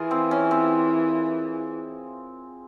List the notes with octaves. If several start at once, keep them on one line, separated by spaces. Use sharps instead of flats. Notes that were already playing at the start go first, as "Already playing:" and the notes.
Already playing: E3 F4 G#4 A#4 C5
C4
C#4
C4